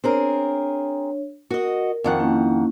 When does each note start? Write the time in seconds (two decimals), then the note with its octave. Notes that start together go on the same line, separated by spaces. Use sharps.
0.04 C4 D4 G#4 A#4 C#5
1.51 F#4 A#4 D#5
2.04 F2 D#3 F#5
2.19 A#3 C#4 E4